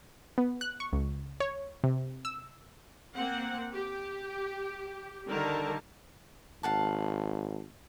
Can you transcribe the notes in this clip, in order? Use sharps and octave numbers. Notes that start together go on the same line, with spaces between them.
B3
F#6
C#6
C#2
C#5
C3
E6
A#3 C4 F#5
G4
D3 D#3 G3 A4 A#4 A5
G#1 F5 F#5 A5